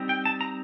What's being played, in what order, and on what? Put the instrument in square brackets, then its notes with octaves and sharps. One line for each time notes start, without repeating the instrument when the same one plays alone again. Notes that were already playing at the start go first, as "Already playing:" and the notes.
Already playing: [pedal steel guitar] G3 C4 D#4
G5
A5
A#5